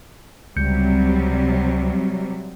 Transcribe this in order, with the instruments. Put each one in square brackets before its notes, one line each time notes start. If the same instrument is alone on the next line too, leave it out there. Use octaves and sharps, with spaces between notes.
[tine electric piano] C#2 G6 C#7 [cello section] C3 F#3 G3